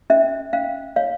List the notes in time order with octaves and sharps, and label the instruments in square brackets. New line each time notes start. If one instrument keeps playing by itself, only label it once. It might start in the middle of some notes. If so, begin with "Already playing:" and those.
[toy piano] C#4 E5
C#4 F5
C#5 F5